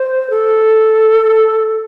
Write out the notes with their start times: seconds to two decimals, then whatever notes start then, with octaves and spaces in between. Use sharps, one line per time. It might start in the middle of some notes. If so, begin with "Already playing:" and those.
Already playing: C5
0.30 A4